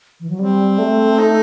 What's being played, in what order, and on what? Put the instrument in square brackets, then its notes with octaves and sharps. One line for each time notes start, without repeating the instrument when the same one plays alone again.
[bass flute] E3
F#3
[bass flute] G3 [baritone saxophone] C4
[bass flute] A3
[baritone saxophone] D#4